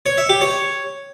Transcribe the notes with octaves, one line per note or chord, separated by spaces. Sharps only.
C#5
E5
G4
C#5